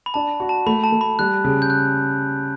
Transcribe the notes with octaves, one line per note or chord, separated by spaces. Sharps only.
B5
D4 A5
F#4
A5
A3 B5
A5
A3
B5
G3 F#6
C#3
G6
F#6